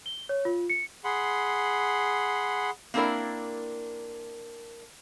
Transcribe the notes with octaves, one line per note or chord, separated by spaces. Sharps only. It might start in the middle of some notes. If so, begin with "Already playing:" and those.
G7
C#5
F4
C#7
G#4 F#5 B5 C6
A#3 C4 D4 E4 A#4 D5